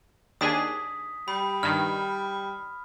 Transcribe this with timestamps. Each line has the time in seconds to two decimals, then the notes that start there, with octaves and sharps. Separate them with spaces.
0.41 D#2 D4 G#4 D#6 B6
1.28 G3 B5
1.63 G2 D#3 F6